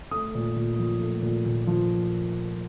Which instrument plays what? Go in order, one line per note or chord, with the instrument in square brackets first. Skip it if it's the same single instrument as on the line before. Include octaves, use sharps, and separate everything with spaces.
[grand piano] A3 D#6
A#2
A#2
F3
A3
A#2
A#2
F3